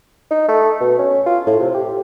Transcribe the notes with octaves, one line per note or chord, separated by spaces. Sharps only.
D#4
A3
B2
C#4
F4
A2
C3
G4